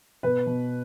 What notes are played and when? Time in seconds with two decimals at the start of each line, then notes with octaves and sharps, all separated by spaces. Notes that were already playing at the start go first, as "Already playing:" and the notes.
0.23 B2 B4
0.47 B2